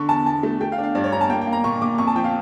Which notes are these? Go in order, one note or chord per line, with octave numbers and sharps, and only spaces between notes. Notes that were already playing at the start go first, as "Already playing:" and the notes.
Already playing: D3 C#6
E2 A5
E2 A5
A3
A3 G5
F5
D4
F5
G2 D5
C#5
G2 A#5
A5
A#3 G5
G5
A#3
A#5
A#2 C#6
A#2 D6
F2 C#6
A5
F3 G5
F5